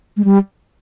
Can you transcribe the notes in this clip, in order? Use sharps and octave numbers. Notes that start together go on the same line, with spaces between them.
G#3
G3